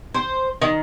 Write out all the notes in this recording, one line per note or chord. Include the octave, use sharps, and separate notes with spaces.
C5
D#3